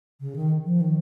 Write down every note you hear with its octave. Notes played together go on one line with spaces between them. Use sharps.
C#3
D#3
F3
D#3